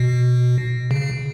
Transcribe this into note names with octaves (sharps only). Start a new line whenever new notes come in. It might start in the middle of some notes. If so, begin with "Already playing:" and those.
Already playing: B2
C#3